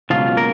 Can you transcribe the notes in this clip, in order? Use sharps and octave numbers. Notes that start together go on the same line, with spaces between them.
C#2 B2 F3 F#3 F4
A#3 A#4